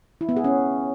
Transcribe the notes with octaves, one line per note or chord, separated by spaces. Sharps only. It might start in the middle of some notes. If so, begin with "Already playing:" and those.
E4
B3
G#4
C#4